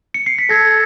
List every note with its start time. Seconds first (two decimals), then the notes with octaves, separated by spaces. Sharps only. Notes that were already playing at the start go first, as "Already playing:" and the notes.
0.14 C#7
0.26 C7
0.38 B6
0.49 A4 G#6 A#6